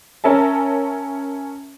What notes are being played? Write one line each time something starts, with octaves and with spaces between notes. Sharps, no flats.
C#4 A#4 E5 A5